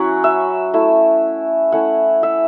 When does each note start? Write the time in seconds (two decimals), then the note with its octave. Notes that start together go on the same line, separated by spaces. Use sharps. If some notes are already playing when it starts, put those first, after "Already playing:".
Already playing: F#3 C#4 E4 F#5
0.24 E5
0.74 A3 E4
1.72 A3 C#4 E4 F#5
2.23 E5